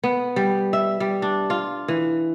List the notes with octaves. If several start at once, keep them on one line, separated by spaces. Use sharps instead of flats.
B3
G3
E5
G3
D4
F4
E3